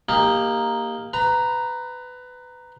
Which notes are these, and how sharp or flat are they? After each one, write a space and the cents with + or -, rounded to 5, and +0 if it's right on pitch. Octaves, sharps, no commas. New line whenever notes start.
A#3 +0 D#4 +0 G4 +20
B4 +20 A#5 +0